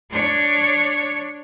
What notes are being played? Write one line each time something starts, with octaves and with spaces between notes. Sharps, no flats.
D4 C#5